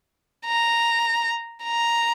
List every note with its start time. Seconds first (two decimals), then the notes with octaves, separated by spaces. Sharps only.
0.45 A#5
1.64 A#5